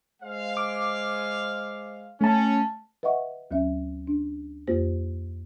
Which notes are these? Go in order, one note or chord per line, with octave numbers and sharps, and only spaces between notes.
G#3 C5 F5
D6
A3 C#4 A5
B4 D#5 E5 F#5 C#6
D2 F#3 C#4 E5
D4
F2 A#3 F4 G4 C5